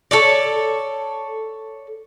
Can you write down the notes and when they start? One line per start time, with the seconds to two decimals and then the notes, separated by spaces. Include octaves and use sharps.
0.11 A4 C#5 D5